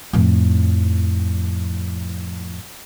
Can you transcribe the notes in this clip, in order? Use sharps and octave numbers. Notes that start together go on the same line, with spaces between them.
F2 A2